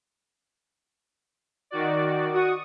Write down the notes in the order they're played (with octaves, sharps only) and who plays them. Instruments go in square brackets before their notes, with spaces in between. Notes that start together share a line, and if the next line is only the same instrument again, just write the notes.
[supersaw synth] D#3 F#4 D5
[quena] F#4 [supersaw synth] C#6 D#6